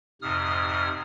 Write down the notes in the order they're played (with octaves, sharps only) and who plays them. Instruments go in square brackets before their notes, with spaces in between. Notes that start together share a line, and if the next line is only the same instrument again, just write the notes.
[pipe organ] F2 G#2 C3 D#6 F6